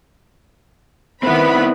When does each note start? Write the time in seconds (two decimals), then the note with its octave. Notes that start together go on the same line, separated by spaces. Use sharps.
1.23 D#3 B3 C4 E4 B5